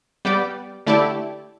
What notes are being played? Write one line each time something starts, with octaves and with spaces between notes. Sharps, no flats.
G3 B3 G4 D5
D3 A3 E4 G4 D5